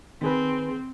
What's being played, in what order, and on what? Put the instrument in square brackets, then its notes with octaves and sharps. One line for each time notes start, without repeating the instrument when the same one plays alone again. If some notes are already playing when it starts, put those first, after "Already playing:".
[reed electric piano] D#3 G#4 B4 [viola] C4